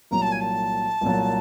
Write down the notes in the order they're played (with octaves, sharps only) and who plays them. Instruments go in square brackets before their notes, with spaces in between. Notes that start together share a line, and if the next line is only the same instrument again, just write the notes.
[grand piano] C2 A#2 F#3 [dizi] A#5
[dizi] A5
G#5
A5
[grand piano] C2 A#2 F#3